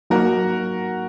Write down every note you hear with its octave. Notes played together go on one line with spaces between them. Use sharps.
F#3 A#3 D#4 F#4 A#4